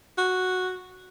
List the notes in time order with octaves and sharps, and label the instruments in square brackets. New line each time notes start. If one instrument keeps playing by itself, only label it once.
[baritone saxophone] F#4